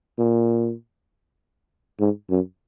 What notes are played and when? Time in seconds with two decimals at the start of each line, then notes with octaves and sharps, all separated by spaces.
0.19 A#2
2.00 G#2
2.30 F#2